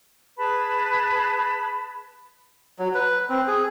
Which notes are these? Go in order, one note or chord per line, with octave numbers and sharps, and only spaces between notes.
G#4 B4 A5 B5
F#3
B4
C4
G#4